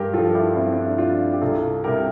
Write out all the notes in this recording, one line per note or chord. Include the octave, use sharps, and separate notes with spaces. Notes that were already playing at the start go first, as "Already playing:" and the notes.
Already playing: G2 G4 A#4
F3 F4 A4
E4 G4
G2 C4 E4
D4
E4
F3 D4 F4
G4
C2 F4 A4
C3 G3 G4 A#4